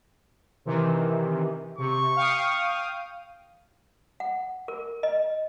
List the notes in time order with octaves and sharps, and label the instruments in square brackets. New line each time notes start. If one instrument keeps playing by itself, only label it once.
[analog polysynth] C3 D#3 E3
[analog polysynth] C3 [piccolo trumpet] C#6
[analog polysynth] F5 G5 D#6
[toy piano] F#5
A#4
D#5